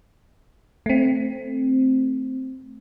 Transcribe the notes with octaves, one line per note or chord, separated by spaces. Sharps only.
A3 C4